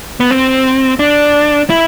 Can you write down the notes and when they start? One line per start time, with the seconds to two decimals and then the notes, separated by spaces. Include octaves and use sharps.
0.20 B3
0.31 C4
0.99 D4
1.70 E4